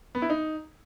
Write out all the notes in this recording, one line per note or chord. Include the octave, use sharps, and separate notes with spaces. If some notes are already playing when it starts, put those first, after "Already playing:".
B3
E4
D#4